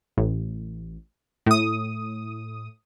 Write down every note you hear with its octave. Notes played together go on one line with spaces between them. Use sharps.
A1
A2 D#6